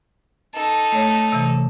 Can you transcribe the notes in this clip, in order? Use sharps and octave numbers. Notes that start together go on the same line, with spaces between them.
D#4 A4
A3 C#5
C3 E3